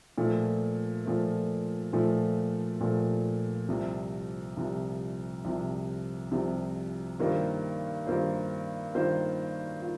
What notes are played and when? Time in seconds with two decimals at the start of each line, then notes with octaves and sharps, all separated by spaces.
0.18 A#2 F3 A3
1.06 A#2 F3 A3
1.93 A#2 F3 A3
2.81 A#2 F3 A3
3.69 C2 C3 F3
4.57 C2 C3 F3
5.44 C2 C3 F3
6.32 C2 C3 F3
7.19 G2 D#3 A#3 F4 C5
8.07 G2 D#3 A#3 F4 C5
8.94 G2 D#3 A#3 F4 C5
9.82 F4